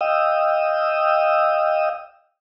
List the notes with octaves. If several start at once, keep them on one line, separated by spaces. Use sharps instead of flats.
D#5 F5 G5 D#6 E6